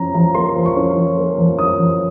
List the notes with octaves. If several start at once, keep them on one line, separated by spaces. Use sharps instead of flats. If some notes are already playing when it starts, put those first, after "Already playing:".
Already playing: F3 C#4 A#5
F3 A#5
A#3 C6
F3
C#6
C#4
F3
A#3
F3
C#4 D#6
F3